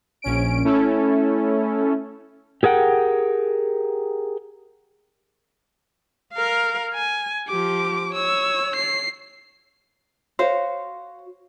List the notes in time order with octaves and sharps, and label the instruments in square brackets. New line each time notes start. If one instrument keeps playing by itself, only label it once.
[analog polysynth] A#1 C#4 D7
A3 C#4 E4 A4
[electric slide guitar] G4 G#4 A#4 F#5 G5
[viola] A#4 F5
G#5
[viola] F3 G4 [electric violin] D6
[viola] C#5 [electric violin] E6
[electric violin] C7
[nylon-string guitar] F#4 C#5 F5 [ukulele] C5